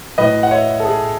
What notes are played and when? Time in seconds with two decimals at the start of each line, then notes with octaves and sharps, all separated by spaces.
0.18 A2 F#3 B4 D#5
0.43 F#5
0.51 C#5 E5
0.80 A4
0.85 G#4